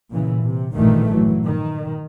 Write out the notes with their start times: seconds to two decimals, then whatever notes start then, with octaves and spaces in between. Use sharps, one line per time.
0.10 A#2 C#3 E3
0.41 C3
0.74 A1 G2 A#2 D#3 E3 A3
1.11 E3 F#3
1.44 D#3